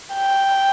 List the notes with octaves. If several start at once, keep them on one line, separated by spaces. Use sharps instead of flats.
G5